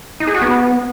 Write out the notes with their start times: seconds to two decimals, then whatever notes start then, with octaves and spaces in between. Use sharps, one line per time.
0.20 D#4
0.27 G#4
0.34 F#4
0.41 B3